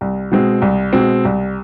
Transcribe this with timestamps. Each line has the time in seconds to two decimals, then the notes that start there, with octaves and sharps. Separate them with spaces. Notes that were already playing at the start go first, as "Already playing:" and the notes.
0.01 C2
0.31 B2 G#3 C4
0.62 C2
0.93 B2 G#3 C4
1.25 C2